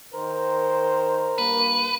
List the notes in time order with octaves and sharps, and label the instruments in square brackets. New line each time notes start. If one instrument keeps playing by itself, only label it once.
[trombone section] D#3 C5 [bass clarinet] A#4
[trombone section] G2 A#3 [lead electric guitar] B4